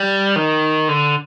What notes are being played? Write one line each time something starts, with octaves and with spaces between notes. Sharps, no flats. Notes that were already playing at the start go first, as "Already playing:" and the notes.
Already playing: G3
D#3
D3